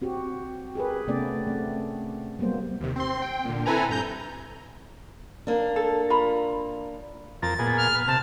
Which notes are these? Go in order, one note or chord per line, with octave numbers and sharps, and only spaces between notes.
C4 F#4 G4
G4 G#4 A#4 B4
C3 A3 B3 C#4 D5
A3 C4
F#3 G3 A#3 B3 C5
D#2 C3
C4 C6
G5
A#2 D3
C4 E4 A4 B4 G#5 A#5
G2 A#5 G6
A#3 D4
A4
F4 A#5 B5
F2 A#4 A6
A#2 B3 G#4
F6
B4
C3 A5